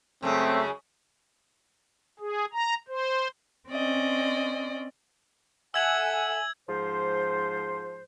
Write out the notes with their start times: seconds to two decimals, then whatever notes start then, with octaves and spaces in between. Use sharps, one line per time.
0.22 F#2 C#3 G#3 A3 C4
2.20 G#4
2.53 A#5
2.88 C5
3.69 C4 C#4 D5 D#5
5.74 A4 E5 F#5 G#5 E6 G#6 F#7
6.68 G#2 F3 C5